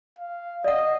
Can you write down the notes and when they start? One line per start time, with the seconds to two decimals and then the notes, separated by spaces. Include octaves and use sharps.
0.19 F5
0.64 D5 D#5 F#5